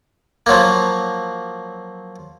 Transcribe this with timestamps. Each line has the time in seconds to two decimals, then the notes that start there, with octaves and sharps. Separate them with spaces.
0.46 F3 F#3 A#3